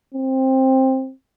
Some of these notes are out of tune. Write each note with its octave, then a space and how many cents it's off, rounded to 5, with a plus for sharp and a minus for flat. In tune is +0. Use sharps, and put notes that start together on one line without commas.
C4 +15